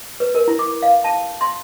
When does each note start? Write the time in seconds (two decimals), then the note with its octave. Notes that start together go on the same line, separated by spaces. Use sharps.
0.20 B4
0.35 A#4
0.48 E4
0.59 D6
0.83 F5
1.04 A5
1.41 C6